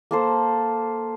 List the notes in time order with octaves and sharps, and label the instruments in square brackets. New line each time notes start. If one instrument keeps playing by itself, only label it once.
[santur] A#3 A4 C5